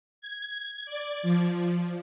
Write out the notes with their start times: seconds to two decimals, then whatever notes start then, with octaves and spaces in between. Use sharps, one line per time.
0.21 G#6
0.86 D5
1.23 F3